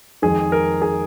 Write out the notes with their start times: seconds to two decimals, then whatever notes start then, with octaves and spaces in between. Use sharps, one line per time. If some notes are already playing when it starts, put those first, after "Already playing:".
0.22 F2 D#3 G#3 G#4
0.52 A#4
0.82 G#4